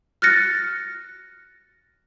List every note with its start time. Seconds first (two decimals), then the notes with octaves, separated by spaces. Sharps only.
0.22 F6 F#6 A6 A#6 C#7